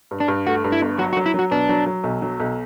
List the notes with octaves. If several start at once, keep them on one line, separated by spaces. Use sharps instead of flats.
G2
D4
G2
A3 F#4
G2
E4
G1
F#3 F#4
F#4
F#3
E4
F#3 F#4
B2 D4
F#3
F#3
B1
F#3
B1